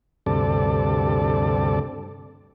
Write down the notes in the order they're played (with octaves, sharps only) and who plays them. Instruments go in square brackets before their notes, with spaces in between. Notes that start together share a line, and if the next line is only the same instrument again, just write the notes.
[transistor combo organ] D2 G2 C3 A4 D5